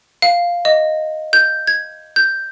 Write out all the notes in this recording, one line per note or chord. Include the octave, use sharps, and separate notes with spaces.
F5
D#5
G6
G#6
G6